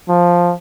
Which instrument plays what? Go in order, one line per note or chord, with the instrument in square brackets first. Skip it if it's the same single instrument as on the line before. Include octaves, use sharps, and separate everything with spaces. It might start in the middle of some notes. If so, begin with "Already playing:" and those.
[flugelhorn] F3